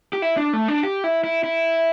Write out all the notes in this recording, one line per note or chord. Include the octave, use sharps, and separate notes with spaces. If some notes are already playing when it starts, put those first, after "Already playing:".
G4
E4
D4
A3
D4
G4
E4
E4
E4